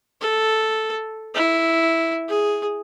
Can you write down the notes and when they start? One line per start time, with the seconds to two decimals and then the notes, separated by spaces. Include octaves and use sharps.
0.21 A4
1.34 E4
2.28 G#4